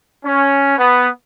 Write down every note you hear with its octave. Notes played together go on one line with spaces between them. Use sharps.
C#4
B3